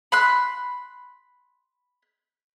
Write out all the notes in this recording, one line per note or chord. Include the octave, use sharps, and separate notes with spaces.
B5 C6 F#6